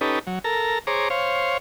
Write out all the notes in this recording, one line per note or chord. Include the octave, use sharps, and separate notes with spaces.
C#4 D#4 G4 A4 B4
F#3
A4 A#4 A#5
G#4 C5 C#5 A#5 D6
C5 C#5 F5